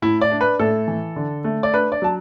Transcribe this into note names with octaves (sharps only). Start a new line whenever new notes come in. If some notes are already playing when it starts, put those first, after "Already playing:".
A2 E4
D5
D4
B4
A2 A4
E3
D3
A3
D5
D4 B4
D5
F#3 A5